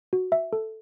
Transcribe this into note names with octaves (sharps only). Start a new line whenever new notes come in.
F#4
E5
A4